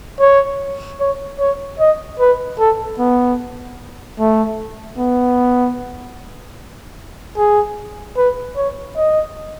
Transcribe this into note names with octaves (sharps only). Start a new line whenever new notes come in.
C#5
C#5
C#5
D#5
B4
A4
B3
A3
B3
G#4
B4
C#5
D#5